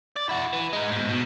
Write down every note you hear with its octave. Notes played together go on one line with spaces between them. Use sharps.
D5
E4 F#4
E3
G#3 D#4
G#2 B2
B2